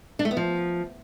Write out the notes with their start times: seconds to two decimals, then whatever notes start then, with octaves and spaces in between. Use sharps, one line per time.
0.19 D4
0.25 A3
0.31 B3
0.37 F3